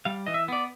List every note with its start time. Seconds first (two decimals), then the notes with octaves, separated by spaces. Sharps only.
0.05 G3 F5
0.26 E3 D#5
0.34 E5
0.48 B3 D5